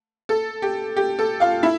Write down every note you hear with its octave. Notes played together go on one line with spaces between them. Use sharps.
A4
G4
G4
A4
F4 F5
E4 E5